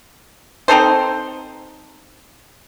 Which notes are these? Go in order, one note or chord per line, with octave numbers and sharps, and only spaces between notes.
C4 D#4 A4 C5